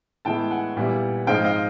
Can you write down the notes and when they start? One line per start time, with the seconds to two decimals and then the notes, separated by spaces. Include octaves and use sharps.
0.25 A2 E3 G#3 B3 E4 G5 A5
0.51 F#5 G#5
0.77 A#2 G3 B3 E4
1.27 G#2 F3 G#3 C4 D#4 F5 G5
1.45 D#5 F5